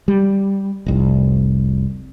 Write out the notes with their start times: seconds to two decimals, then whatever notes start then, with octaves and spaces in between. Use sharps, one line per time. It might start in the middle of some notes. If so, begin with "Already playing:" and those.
0.08 G3
0.86 F1 C2